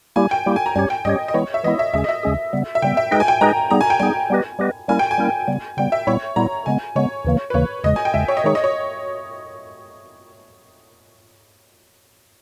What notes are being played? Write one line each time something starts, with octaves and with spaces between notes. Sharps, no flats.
G3 A#3 E4 G4 G#5
G5
G3 A#3 E4 G4
G#5
A#5
G2 G3 C#4 G4 C#5 G#5
G5
G2 G3 C#4 G4 C#5 D#5
D#5
E3 G#3 B3 E4 C#5
E5
E3 G#3 B3 E4 D#5
E5
D#2 C#3 G#3 C#4 G#4 E5
D#5
E5
D#2 C#3 G#3 C#4 G#4
C#3 G3 B3
E5
C#3 G3 B3 G5
E5
G#3 D#4 G#4 B4 D#5 G5
G#5
G5
G#3 D#4 G#4 B4 D#5 A#5
G3 B3 D#4 G#4 A#5
G#5
G5
G3 B3 D#4 G#4 G#5
G3 B3 G4 B4 D#5
G3 B3 G4 B4 D#5
G3 A#3 C#4 E4 A#4 G#5
G5
G#5
G3 A#3 C#4 E4 A#4
C#3 G3 B3
C#3 G3 B3 G5
E5
A#2 G3 B3 E4 C#5
A#2 G3 B3 E4 A#5
C#3 G#3 B3 G#5
C#3 G#3 B3 C#5
D#2 C#3 E3 A#3
B4
D#2 C#3 E3 A#3 C#5
E2 C#3 G#3 D#5
G#5
G5
E2 C#3 G#3 E5
C#5
D#5
D#3 G#3 D#4 G#4 C#5
D#5
C#5